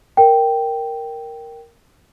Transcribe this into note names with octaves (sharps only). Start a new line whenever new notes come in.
A#4 G5